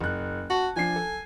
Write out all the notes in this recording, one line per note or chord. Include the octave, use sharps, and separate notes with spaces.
F#1 F#6
F#4 A5
F3 D4 G#5 C7
A4